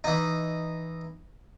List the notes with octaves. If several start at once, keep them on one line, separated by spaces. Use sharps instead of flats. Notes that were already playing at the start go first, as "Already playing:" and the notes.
E3 D#4